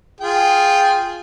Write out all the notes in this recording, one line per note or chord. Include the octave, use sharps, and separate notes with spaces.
F4 G#4 G5